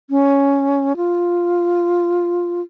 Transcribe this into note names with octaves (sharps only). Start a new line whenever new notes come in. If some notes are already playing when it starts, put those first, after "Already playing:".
C#4
F4